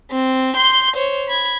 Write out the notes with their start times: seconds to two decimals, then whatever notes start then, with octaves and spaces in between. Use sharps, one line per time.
0.11 C4
0.55 C6 G6
0.96 C5 C#5
1.28 B5 G#6